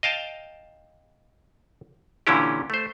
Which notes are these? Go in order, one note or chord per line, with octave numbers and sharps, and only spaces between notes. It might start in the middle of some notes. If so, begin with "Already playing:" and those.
D#5 F5 G5 A5
A#2 D3 E3 C#4 E4 G4
A3 C5